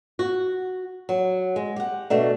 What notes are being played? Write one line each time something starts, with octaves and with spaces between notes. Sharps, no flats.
F#4
F#3
G#3
G4 F#5
B2 A3 D4